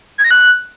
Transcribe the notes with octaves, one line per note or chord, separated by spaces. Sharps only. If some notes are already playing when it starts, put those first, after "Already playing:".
G#6
A#6
F#6